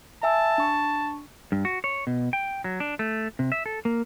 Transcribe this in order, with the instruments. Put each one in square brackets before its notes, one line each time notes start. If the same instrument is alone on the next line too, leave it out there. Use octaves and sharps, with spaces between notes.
[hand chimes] E5 G#5 E6 [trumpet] A5
[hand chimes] D4 C#6
[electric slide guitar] G2
F#4
C#5
B2
G5
F#3
D4
A3
C3
E5
A4
A#3